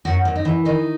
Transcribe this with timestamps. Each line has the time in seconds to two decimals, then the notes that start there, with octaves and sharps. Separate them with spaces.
0.05 F#2 F#4
0.25 F#2
0.35 D#4
0.45 E3
0.65 D#3 D#4